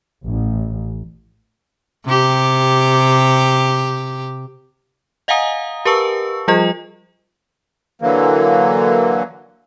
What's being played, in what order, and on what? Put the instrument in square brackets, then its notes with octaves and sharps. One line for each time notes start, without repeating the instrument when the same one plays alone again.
[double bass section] A1
[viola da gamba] C3 G4
[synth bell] D#5 F5 F#5 G#5 A#5 D#6
G4 A#4 B4 A5 C#6 E6
F3 G3 F4 G#4 D#5
[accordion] D3 E3 F#3 A#3